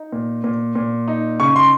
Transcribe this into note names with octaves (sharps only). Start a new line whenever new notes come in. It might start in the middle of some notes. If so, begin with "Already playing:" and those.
Already playing: D#4
A#2
A#2
A#2
D#4
C#3 C#6
C6